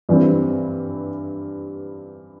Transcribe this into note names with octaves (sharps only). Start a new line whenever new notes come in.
G2 E3 G3 C4